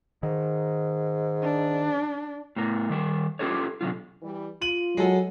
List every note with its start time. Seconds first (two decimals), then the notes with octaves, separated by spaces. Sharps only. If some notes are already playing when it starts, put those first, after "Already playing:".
0.23 G#2 D#3
1.43 D4
2.56 A2 B3 A#4
2.90 D#3 G3 A#4
3.39 C#4 F4 G4 A4 B4 C#5
3.81 B2 D3 F#3 F4
4.22 E3 G3
4.62 F4 D#7 F#7
4.97 F#3 G#3 A4